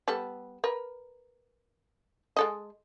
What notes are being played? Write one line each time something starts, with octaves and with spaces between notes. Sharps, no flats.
G3 B3 A4
A#4 B4
G#3 A4 D#5